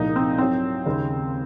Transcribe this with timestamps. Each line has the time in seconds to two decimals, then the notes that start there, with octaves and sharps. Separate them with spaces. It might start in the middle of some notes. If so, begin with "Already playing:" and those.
Already playing: C2 A#2 F3 G#3 D#4
0.16 C4
0.38 G#2 F#3 C4
0.86 D#2 C#3 G#3